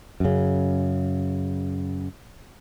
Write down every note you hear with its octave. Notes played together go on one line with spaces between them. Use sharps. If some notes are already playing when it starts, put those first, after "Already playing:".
F#2 C#3